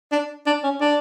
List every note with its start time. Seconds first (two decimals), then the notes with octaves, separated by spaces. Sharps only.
0.12 D4
0.46 D4
0.63 C#4
0.81 D4